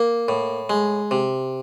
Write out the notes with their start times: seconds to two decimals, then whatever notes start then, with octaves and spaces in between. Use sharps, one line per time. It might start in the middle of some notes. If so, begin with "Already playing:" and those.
Already playing: A#3
0.28 A2
0.70 G#3
1.11 C3